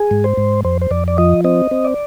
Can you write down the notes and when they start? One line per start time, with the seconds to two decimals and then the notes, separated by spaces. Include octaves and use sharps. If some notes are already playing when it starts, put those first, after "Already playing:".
Already playing: G#4
0.11 G#2
0.24 C5
0.37 G#2
0.64 F2 C5
0.81 C5
0.91 F2 D5
1.08 D5
1.18 F3 D#5
1.44 C4 D#5
1.71 C4
1.85 D5